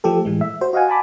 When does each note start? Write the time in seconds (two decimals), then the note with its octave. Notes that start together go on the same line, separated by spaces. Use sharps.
0.04 F3 A3 G4 A4
0.25 A2 E3 G#3
0.41 E5
0.61 F#4 C5
0.73 F#4 D#5 F5 F#5 G#5
0.89 G#5 A5 B5 D6